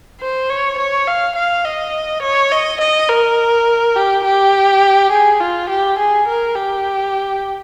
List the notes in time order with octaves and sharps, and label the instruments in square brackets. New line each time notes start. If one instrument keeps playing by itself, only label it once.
[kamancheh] C5
C#5
C#5
F5
F5
D#5
C#5
D#5
D#5
A#4
G4
G4
G#4
F4
G4
G#4
A#4
G4